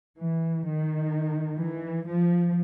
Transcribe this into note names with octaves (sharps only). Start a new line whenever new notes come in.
E3
D#3
E3
F3